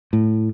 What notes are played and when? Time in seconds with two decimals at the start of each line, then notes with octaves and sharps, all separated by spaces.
0.13 A2